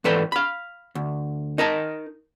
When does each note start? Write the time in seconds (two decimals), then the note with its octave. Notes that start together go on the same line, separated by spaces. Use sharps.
0.04 G#2 E3 A4 B4 D5 G5
0.32 F5 B5
0.95 D2
1.58 D#4 A#4 D#5 A5